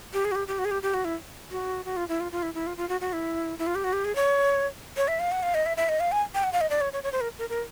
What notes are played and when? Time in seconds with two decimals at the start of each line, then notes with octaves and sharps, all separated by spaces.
0.13 G4
0.25 G#4
0.32 F#4
0.35 G4
0.48 G4
0.59 F#4
0.65 G#4
0.71 G4
0.83 G4
0.94 F#4
1.05 E4
1.51 F#4
1.85 F#4
1.97 F4
2.08 E4
2.20 F4
2.32 F4
2.43 E4
2.54 E4
2.67 F4
2.77 F4
2.89 F#4
3.01 F#4
3.13 E4
3.59 E4
3.67 F4
3.75 G4
3.84 F#4
3.93 G4
4.05 G#4
4.16 C#5
4.97 C#5
5.08 E5
5.20 F5
5.32 F#5
5.43 F5
5.54 D#5
5.66 E5
5.77 E5
5.89 D#5
6.00 F5
6.12 G#5
6.35 G5
6.44 F#5
6.53 F5
6.61 D#5
6.70 D5
6.81 C#5
6.93 C#5
7.04 C#5
7.12 C5
7.21 A#4
7.39 A#4
7.50 A#4